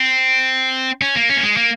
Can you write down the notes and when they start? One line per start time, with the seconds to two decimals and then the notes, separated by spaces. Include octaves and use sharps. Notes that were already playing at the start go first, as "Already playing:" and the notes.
Already playing: C4
1.02 C#4
1.16 A#3
1.29 C#4
1.37 A#3
1.43 G#3
1.57 A#3